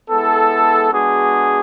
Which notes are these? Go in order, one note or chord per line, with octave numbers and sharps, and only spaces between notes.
G#3 B3 E4 A4
G#3 B3 D4 F#4 G#4